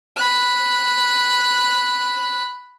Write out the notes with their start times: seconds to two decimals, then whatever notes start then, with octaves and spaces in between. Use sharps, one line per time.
0.16 B5 F#6